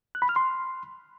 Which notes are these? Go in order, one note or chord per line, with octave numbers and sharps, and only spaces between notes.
F#6
B5
F6
C6